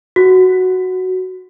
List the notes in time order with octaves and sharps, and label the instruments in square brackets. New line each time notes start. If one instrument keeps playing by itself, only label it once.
[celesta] F#4